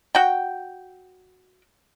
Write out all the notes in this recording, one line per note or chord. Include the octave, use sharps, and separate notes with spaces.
F#4 G5